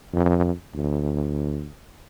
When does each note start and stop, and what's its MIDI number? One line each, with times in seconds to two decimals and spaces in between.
0.13 0.51 41
0.75 1.68 38